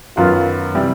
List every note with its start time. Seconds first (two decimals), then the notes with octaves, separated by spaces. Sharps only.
0.17 F#2 D#3 F#3 B3 F4
0.75 C3 E3 G3